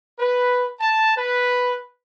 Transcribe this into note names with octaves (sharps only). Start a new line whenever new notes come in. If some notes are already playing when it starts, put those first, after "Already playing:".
B4
A5
B4